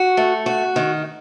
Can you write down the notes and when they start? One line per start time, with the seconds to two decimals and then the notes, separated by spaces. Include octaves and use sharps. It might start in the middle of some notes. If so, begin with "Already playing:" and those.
Already playing: F#4
0.17 A3
0.46 F#4
0.76 D#3